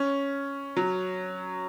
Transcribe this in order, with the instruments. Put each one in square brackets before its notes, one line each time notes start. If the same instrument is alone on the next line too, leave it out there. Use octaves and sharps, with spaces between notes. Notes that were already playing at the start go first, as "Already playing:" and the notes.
Already playing: [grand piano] C#4
F#3